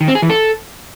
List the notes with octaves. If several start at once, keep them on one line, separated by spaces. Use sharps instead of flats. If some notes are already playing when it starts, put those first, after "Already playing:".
D#3
C4
G#4
E3
A4